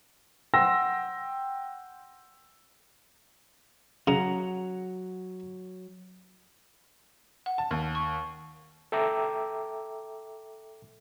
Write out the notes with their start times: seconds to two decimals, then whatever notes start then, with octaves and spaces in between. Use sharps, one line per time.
0.53 F#5 G5 C6 E6 A#6
4.07 C#3 F#3 F#5 A#5
7.46 F#5
7.58 A5
7.71 D#2
7.95 C#6
8.92 A4 E5 G5 A#5 D6 E6